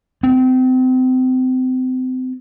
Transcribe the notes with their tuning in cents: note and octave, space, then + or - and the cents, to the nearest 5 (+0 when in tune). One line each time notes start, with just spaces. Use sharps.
C4 -35